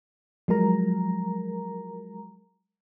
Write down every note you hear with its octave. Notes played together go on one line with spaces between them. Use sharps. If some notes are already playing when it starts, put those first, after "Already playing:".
F3 F#3 G#3 A#4 A#5